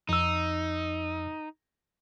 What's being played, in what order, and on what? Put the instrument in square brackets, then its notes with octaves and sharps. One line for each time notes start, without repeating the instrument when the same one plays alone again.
[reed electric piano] F2 E6 [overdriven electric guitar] D#4